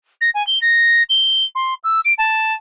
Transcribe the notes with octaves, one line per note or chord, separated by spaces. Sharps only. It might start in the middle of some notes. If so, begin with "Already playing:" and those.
A#6
G#5
G7
A#6
G7
C6
E6
D7
A5